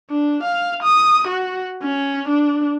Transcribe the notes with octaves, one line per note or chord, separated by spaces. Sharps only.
D4
F5
D#6
F#4
C#4
D4